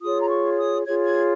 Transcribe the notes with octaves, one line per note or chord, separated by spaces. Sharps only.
F4 G#4 C#5 D#6
A#5
C#6
D#6
F4 G#4 C#5 G#6
G#6